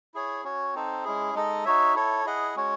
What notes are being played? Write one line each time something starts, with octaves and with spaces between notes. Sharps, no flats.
E4 G#4 C#5
C#4 F#4 C#5
C4 D#4 A4 C5
G#3 C#4 E4 G#4
G#3 D#4 A4 D#5
D#4 F#4 C#5 E5
E4 A4 C#5
E4 G#4 D#5 F#5
G#3 C#4 F#4 C#5